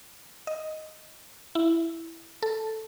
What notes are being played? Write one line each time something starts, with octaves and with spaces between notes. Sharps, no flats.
D#5
E4
A4